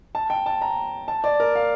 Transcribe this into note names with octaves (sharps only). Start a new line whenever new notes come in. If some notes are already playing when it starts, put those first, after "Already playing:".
A5
G5
A5
A#5
A5
D5
A#4
F5